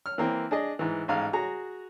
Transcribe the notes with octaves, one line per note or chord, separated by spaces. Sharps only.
F6
E3 A#3 C4
D4 G#4 D#5
G#2 E3
A1 G#2 F5
F#4 G#4 A#5